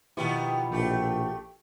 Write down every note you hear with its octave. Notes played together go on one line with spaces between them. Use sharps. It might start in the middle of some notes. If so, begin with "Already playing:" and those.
B2 D#3 F3 B3 E4 G4
A#1 A3 G4